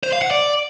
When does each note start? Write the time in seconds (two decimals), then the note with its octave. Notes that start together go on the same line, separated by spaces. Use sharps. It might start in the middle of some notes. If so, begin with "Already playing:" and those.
0.03 C5
0.13 F5
0.22 F#5
0.31 D5